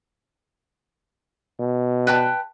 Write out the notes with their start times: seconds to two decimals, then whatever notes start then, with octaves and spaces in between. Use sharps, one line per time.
1.60 B2
2.07 B4 G5 A5